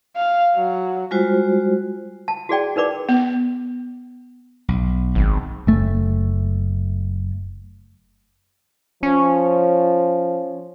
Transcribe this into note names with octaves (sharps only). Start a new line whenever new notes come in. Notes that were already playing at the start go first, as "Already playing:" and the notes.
F5
F#3
G3 G#3 F4 F#4 C5
A5
F#4 G#4 D5 G5
D#4 A#4 B4 D5 D6
B3
B1
G#1
F#1 A3
F3 C#4